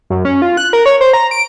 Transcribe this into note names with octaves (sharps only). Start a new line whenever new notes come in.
F#2
C#4
F4
F#6
A#4
C#5
C5
A#5
D7